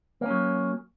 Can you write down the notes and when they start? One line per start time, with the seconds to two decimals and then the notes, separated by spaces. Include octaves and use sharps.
0.21 A#3
0.26 C#4
0.30 F#3